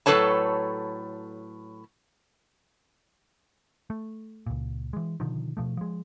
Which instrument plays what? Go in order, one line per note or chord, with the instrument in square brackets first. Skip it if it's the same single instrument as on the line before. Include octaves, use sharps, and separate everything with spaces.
[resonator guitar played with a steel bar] A2 F#3 A4 B4 C#5 A5
[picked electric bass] A3
C#2 A#2
E3 G#3
B2 D3 D#3 F3
B2 F3 A3
F3 G#3